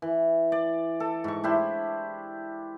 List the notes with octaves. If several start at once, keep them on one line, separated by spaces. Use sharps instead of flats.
E3
D5
A4
G#2 C#6
D4 E4 G4 C5